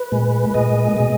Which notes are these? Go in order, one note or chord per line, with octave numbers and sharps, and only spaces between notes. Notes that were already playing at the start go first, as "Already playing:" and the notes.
Already playing: B4
A#2 G#3
A#2 G#3 D#5
B2 G#3